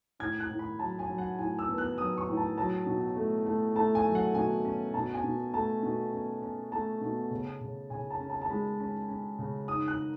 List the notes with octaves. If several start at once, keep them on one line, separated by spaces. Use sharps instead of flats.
A2 G#6
F#6
A2
B5
F#3 A5
G#5
F#3
F#5
A2 G#5
E6
B3
F#6
F#3 D#6
C#6
A2
A5
F#3 A5
B2
A3
A3
A3 A5
G#5
F#3
F#5
B2 G#5
C#4
B2 A5
G#5
B2
A3 A5
B2
C#4
C#4
A3 A5
B2
C#3
C#3
C#3 G#5
A5
C#4
A5
A5
G#3 B5
C#4
C#4
C#3
G#2 D#6
F#6